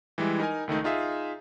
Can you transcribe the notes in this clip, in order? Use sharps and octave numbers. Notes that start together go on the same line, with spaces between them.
E3 G3 G#3 E4
D#4 A#4 G#5
C#2 D#3 A3 D#4
D#4 F4 G#4 E5